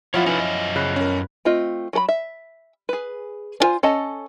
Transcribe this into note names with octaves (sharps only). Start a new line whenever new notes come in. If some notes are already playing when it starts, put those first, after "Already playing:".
F3 E4 F4 C#5 F5 F#5
C#4 D#4 B4
F#2 D#5
C#3 B4
C#4 A#4
A3 C4 F4 D#5
F#3 A4 B5
E5
G#4 B4
D4 F4 C5 G#5
C#4 A4 D#5 A5